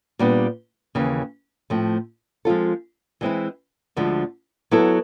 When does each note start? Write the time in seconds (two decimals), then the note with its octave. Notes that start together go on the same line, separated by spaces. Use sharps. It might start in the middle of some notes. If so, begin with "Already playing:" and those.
0.19 A#2 G3 B3 D4
0.95 D#2 C#3 E3
1.70 A2 F3 A3 C4
2.45 F3 G#3 C4 F4 A4
3.21 E3 G#3 C4 E4
3.96 D2 D3 F3 G#3
4.71 F#3 B3 E4 A4